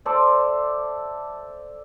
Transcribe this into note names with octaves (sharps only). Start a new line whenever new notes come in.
A4 C5 D5 E5